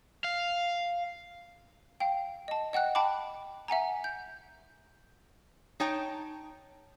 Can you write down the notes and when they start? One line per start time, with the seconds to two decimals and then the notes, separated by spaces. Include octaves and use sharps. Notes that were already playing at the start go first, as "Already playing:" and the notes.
0.24 F5
2.00 F5 G5
2.48 D#5 A5
2.73 D#5 F#5 G5 F#6
2.95 G5 A5 B5 D6
3.68 E5 F#5 G#5 A#5
4.04 G6
5.80 D#4 C#5 G5 A5